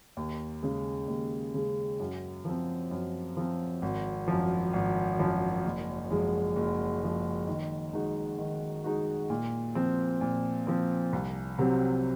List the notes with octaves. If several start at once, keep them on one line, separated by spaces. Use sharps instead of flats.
D#2
C#3 G#3
D#2
C#3 G#3
F#2
F3 C4
F#2
F3 C4
G#1
F#2 F3
G#1
F#2 F3
F#1
F#2 F3 G#3
F#1
F#2 F3 G#3
D#3
G#3 D#4 F#4
D#3
G#3 D#4 F#4
A#2
F3 C4
A#2
F3 C4
C2
C3 F#3 C4